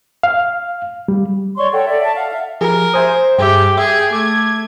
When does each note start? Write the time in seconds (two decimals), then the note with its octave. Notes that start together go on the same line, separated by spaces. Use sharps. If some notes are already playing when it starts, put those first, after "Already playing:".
0.23 F5
1.08 G3
1.57 C#5 D5 C6 C#6
1.72 A4 C#5 F#5 G5
1.87 A4 D5 E5
2.02 E5 A5
2.15 F5 F#5
2.31 E5 F5
2.61 F3 G4 G#4 A#4
2.94 C5 E5 G#5 D#6
3.38 G2 G4 G#4 E5 G5
3.78 G#4 E5
4.13 A3 D6 G#6